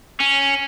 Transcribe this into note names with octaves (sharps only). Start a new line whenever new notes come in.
C#4